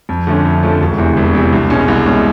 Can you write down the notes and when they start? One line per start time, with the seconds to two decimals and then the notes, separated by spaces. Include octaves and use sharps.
0.09 F2
0.27 D3 F3 A3 C#4
0.45 F2
0.63 D3 F3 A3 C#4
0.81 E1
0.98 E2 C3
1.17 E1
1.35 E2 C3
1.52 C2
1.70 B2 G#3 C#4
1.88 C2
2.06 B2 G#3 C#4